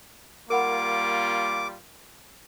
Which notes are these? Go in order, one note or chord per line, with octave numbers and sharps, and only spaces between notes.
G3 A#3 F4 A#4 F#5 B5 D6